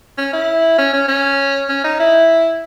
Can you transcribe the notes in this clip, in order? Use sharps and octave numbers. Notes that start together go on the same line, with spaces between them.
C#4
E4
C#4
C#4
C#4
C#4
D#4
E4